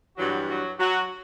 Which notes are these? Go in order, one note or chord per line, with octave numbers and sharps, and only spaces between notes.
G2 E3 F#3 G3 F#4
F#3 F#4
F#3 F#4